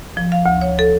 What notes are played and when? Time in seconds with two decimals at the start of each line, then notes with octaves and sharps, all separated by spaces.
0.17 F3
0.32 F5
0.46 D2
0.61 C#5
0.79 A4